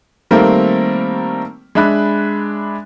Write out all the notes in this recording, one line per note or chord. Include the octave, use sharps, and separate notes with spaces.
D#3 G3 A3 A#3 C4 A#4
G#3 D4 E5 B5 F#6